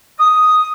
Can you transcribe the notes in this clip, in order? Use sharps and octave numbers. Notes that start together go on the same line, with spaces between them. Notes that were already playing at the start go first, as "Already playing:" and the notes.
D#6